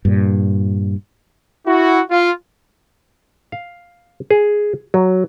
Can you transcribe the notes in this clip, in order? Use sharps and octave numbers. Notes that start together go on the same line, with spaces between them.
G2 A#2
E4 F#4
F4
F5
G#4
F#3